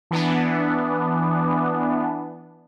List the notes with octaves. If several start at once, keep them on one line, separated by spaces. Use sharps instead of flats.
E3 B3 D4